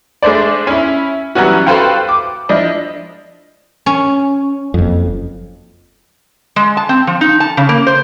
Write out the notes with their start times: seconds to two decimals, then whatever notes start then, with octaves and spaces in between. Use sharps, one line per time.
0.23 G#3 A3 D4 C5 D5
0.67 C#4 E4
1.35 E3 F#3 G3 B3 C#4 F#4
1.67 F#4 A4 B4 C5 F5 G5
2.09 D6
2.49 F3 D4 E4 D#5
3.86 C#4
4.74 F#1 F2
6.56 G#3
6.77 A5
6.89 C4
7.07 F3
7.21 D#4
7.40 A5
7.57 C#3
7.69 A#3
7.87 C5